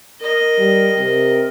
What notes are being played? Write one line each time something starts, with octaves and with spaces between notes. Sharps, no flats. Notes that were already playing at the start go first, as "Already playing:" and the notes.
A#4 D#5
G3
C3 A#4